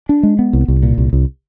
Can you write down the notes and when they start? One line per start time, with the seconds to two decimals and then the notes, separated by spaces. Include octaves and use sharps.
0.09 D4
0.23 G#3
0.39 B3
0.53 C2
0.68 C2
0.83 A#2
0.98 C2
1.13 C2